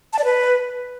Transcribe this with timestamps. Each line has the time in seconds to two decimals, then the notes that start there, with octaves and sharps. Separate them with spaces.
0.13 A5
0.19 D5
0.24 B4